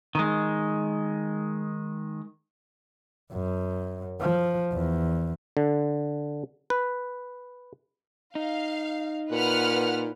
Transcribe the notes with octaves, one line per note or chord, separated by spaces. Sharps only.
D#3 G#3
F#2
F3
E2
D3
B4
D#4 F5
A#2 B4 F#5 F6